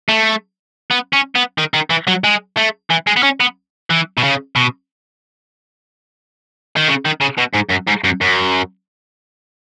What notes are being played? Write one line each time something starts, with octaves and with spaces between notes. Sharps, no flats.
A3
B3
C#4
B3
D#3
D#3
E3
F#3
G#3
A3
E3
G#3
B3
C#4
B3
E3
B2
C#3
B2
D#3
C#3
D#3
C#3
B2
G#2
F#2
G#2
F#2
F#2